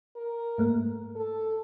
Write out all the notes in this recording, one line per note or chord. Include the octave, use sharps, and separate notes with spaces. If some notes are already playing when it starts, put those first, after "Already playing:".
A#4
G#2 A3 A#3
A4